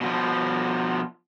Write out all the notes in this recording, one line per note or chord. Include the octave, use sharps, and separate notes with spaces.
B2 D#3 F3